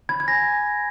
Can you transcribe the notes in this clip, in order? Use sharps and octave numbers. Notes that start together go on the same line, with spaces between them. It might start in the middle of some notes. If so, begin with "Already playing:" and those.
B5 G#6
G#6
G#5 A#6